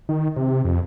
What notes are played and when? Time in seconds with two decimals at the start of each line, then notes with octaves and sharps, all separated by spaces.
0.09 D#3
0.36 C3
0.65 F2